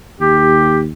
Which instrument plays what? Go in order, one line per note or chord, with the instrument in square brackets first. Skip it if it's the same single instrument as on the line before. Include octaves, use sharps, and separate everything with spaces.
[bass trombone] D#2 [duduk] G4